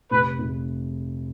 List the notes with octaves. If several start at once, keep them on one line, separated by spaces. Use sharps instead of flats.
F1 B4
F1